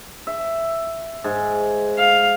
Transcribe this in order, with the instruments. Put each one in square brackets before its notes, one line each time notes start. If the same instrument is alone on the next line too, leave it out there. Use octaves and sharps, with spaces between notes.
[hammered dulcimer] E5
G#2
[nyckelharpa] F5